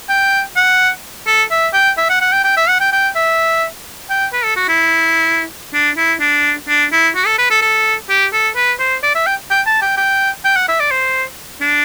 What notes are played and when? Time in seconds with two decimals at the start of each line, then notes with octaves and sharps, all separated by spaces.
0.09 G5
0.57 F#5
1.27 A4
1.51 E5
1.74 G5
1.98 E5
2.10 F#5
2.21 F#5
2.33 G5
2.44 G5
2.57 E5
2.69 F#5
2.80 G5
2.92 G5
3.16 E5
4.10 G5
4.33 B4
4.44 A4
4.56 F#4
4.69 E4
5.74 D4
5.97 E4
6.21 D4
6.68 D4
6.92 E4
7.16 F#4
7.26 A4
7.38 B4
7.51 A4
7.62 A4
8.09 G4
8.33 A4
8.56 B4
8.79 C5
9.03 D5
9.15 E5
9.27 G5
9.50 G5
9.66 A5
9.82 G5
9.97 G5
10.45 G5
10.56 F#5
10.69 E5
10.80 D5
10.91 C5
11.61 D4